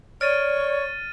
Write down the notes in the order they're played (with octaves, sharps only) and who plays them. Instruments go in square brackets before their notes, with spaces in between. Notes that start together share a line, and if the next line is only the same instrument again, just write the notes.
[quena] C#5 [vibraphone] D5 [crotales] F6 A6 D#7